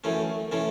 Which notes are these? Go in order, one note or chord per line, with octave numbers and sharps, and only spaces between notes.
F#2 E3 A3 C#4
E3 A3 C#4